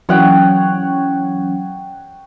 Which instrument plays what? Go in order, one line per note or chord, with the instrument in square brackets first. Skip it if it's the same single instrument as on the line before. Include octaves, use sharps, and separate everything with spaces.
[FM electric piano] E3 F#3 C#4 [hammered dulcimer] C#5 F#5 G5